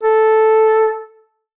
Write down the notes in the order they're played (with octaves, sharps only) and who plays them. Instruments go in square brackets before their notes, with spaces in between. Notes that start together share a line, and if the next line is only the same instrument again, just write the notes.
[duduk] A4